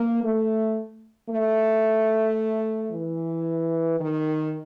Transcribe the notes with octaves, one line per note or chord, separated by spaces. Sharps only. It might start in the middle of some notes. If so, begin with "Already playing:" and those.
Already playing: A#3
A3
A3
E3
D#3